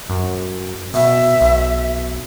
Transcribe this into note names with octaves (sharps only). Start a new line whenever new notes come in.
F#2
B2 E5
B1